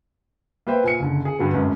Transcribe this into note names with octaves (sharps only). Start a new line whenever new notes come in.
A#3 B3 B4 C5 E5 G5
A#2 G#5 C#7
F#1 D3
G#4
G2 D3 F#3 B3
G#1 F#2 A2